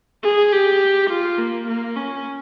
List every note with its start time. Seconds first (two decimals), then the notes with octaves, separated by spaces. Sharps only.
0.23 G#4
0.52 G4
1.10 F4
1.38 A#3
1.67 A#3
1.96 C#4